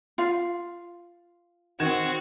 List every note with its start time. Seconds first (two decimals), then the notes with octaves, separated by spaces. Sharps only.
0.18 F4 F5
1.80 D#3 C4 F#4 G#6 E7